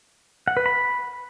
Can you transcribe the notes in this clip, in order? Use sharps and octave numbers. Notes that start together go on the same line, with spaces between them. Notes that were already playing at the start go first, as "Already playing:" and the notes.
F#5
B4
B5